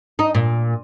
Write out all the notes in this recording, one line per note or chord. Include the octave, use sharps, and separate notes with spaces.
D#4
A#2